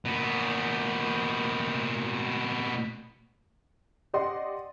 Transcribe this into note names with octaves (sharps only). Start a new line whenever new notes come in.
A#2 B3
G4 D5 D#5 F#5 C6